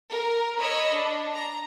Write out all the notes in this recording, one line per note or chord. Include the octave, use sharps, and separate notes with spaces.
A#4
C#5 D#5 B5 E6
D4
A#5